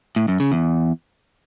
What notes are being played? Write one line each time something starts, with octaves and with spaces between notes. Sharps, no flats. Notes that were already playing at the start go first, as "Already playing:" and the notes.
A2
F#2
C#3
E2